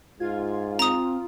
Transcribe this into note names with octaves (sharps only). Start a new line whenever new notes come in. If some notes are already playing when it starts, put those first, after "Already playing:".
G#2 F4 G#6
C4 A#5 D#6